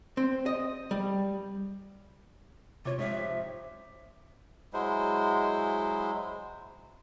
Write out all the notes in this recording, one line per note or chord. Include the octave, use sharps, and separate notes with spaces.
C4
D#5
G3
C3 F4 C#5 D6
F2 G#2 C3 E5
F#3 G#3 E4 C5